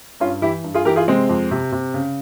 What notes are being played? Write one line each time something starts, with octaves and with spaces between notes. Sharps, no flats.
G2 C#4 F4
E3 E4 G4
G2
F4 G#4
E3 G4 A#4
F4 G#4
C3 G#3 C4
F2
C3
C3
C#3